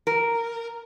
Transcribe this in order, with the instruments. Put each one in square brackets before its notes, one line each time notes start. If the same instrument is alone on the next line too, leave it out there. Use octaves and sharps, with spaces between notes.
[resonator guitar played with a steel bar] A#4